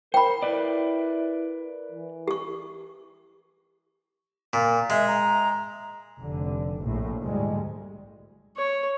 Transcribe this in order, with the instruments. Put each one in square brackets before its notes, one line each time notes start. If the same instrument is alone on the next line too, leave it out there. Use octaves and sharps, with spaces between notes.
[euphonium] A#4 [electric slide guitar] C5 [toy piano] G5 B5
[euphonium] E4 [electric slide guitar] A#4 B4 D5
[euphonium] E3
[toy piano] G4 C#6
[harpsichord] A#2
[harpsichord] G#3 [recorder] E5
[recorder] A#5
[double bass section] F1 D3
A#1 A2
D2 G#2 G3 G#3
[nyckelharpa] C#5